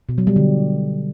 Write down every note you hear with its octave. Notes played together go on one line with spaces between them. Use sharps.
B2
F#3
G3
D3